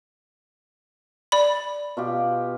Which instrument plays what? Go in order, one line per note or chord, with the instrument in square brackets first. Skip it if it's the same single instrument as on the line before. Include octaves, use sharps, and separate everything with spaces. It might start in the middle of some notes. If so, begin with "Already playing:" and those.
[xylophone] D5 B5
[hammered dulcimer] B2 F4 G4